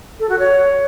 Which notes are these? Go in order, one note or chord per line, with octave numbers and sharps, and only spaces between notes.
A4
F#4
C#5